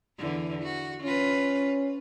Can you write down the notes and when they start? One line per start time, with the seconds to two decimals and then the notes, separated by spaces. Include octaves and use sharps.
0.18 E2 D3 E3
0.63 F#4
1.03 C#4 F4 B4